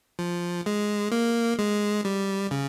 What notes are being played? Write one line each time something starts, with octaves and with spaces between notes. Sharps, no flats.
F3
G#3
A#3
G#3
G3
C#3